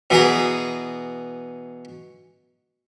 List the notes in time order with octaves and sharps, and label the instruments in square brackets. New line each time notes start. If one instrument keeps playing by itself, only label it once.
[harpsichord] B2 E3 G#4 A#5